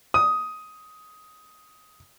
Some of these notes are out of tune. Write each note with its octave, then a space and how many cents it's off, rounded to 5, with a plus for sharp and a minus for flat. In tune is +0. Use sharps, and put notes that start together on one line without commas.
D#6 +10